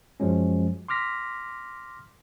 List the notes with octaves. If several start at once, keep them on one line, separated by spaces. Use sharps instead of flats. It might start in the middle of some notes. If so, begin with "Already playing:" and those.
F#2 F3 F#3 G#3 C#4
C6 D6 F6 A#6 B6